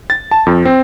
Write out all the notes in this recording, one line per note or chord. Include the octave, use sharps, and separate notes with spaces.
A6
A5
F2
C4